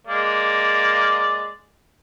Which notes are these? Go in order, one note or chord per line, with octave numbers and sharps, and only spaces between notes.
G#3 A#3 D5